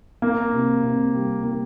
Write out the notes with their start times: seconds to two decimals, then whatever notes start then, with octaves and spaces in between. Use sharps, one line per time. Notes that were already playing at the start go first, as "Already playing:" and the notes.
0.22 A#3
0.53 C3
0.83 C3
1.14 G3
1.43 A#3